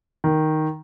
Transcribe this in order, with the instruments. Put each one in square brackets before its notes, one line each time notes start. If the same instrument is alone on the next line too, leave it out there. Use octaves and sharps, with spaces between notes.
[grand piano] D#3